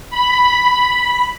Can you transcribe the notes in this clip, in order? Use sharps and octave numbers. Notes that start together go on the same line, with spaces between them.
B5